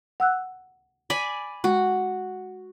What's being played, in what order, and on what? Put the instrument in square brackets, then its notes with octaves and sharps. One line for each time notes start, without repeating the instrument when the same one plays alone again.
[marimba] F#5 E6 F#6
[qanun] D5 G#5 B5
[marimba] G#3 [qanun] F#4